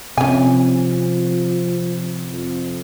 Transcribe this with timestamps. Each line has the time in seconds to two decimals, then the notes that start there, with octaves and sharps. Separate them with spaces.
0.18 C3 F3 C#4 G#5
2.33 F2